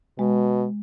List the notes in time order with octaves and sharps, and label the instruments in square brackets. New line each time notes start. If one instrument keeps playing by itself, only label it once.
[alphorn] B2 [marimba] G#3